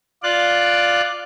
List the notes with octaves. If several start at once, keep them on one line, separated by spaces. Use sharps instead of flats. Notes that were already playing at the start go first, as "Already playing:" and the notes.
F4 D5 F#6